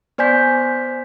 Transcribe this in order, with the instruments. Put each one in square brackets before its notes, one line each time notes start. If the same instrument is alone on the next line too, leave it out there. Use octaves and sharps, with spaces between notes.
[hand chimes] B3 C5 D5 G#5 G6 B6